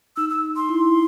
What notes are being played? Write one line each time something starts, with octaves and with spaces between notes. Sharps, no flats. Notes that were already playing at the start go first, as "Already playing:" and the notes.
D#4 E6
E6
C6
E4